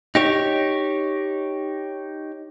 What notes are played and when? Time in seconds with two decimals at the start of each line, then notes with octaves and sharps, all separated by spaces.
0.15 D#4 G4 C#5